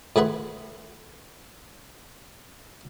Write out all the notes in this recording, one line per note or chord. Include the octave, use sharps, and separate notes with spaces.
A2 A3 G#4 B4 F#5 C6